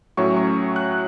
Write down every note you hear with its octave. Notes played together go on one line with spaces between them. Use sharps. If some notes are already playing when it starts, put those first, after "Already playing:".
A2 F#3 C#4 C#6
C#6
F#6